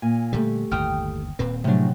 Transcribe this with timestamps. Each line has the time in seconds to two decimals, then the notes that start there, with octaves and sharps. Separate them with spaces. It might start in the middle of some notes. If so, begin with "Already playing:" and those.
0.02 A#2 G#5
0.33 A#2 D3 G3 A3 G4
0.71 G1 D#2 A2 G5 D#6 F6
1.39 D#1 A#2 C4 B4
1.64 A2 C3 F3 F#3 G#3 D4